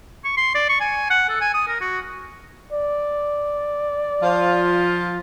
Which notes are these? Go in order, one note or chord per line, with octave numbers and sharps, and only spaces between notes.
C#6
C6
D5
C#6
G#5
F#5
A4
G#5
D#6
A#4
F#4
D5
F3 F4